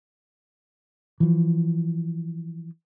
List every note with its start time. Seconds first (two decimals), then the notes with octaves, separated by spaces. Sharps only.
1.20 E3 F3